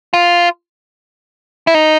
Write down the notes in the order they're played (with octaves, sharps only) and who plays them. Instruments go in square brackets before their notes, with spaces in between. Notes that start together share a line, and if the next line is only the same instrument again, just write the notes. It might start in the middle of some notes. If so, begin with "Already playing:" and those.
[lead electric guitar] F4
E4
D#4